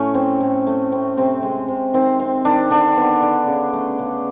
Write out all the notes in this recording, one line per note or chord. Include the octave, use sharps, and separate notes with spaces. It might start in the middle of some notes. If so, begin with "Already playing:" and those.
Already playing: A2 A3 C#4
C4
A2
A3
C4
C3 C4
G#3
C3
D#3 C4
C4
D#3 D4
D3 D4
B3
D3
C#3
A3
C#3